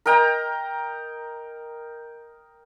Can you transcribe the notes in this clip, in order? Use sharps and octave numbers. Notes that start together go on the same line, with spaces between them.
A#4 D#5 G5 A#5